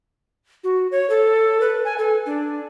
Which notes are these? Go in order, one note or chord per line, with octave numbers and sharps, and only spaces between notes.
F#4
C#5
A4
B4
G#5
A4
D4